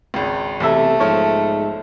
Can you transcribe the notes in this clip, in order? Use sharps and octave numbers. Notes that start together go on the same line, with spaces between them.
G#1 C#2
B1 E2 C3 A3 E5
G#2 F3 C#5